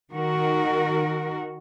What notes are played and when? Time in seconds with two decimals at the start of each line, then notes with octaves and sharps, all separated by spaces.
0.13 D#3 F#4 A#4